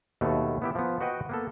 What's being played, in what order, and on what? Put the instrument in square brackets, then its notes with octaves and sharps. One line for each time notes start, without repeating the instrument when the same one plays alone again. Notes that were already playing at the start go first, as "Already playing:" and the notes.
[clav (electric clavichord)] D#2 B2 A3
B3 E4 G4
F3 B3
F#4 B4 D#5 F#5 G5
A#3 B3 A4